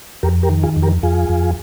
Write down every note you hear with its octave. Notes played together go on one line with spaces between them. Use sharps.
F2 G4 A#4
G4 A#4
D#3
F4 G#4
F2
G4 A#4
F2 F4 G#4
F2